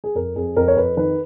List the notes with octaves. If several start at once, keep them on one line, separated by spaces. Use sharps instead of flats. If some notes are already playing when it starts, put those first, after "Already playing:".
G#4
F2 A#4
F2 G#4
F2 A#4
C#5
F2 B4
D#3 B4